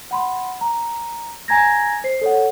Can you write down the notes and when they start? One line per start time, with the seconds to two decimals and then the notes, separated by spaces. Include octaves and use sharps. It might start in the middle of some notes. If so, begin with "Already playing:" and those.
0.11 F#5 B5 C6
0.61 A#5
1.48 G#5 A#5 G#6 A#6
2.04 C5 C7
2.21 A4 C#5 F#5